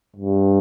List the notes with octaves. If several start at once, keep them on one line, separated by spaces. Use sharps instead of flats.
G2